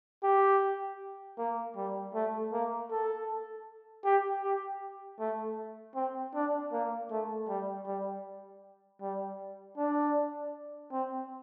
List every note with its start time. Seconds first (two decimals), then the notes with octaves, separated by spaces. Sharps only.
0.23 G4
1.38 A#3
1.76 G3
2.14 A3
2.52 A#3
2.91 A4
4.04 G4
4.43 G4
5.19 A3
5.95 C4
6.34 D4
6.72 A#3
7.11 A3
7.49 G3
7.87 G3
9.01 G3
9.77 D4
10.92 C4